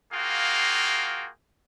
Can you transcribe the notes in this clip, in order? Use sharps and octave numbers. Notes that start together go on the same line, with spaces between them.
A#3 F4 F#4 G#4 F5 G5